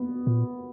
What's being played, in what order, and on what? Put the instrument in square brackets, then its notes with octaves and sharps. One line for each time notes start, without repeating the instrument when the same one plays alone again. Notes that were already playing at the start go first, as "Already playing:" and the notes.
Already playing: [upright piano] B3
[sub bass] A#2